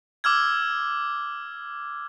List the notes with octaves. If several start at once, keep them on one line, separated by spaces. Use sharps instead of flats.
D6 E6 F6 G#6